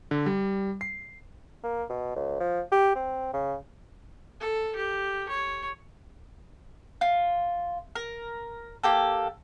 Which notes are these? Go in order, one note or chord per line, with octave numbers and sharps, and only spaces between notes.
D3
G3
C7
A#3
B2
C#2
F3
G4
C4
C#3
A4
G4
C#5
F4
A#4
A#3 G4 A4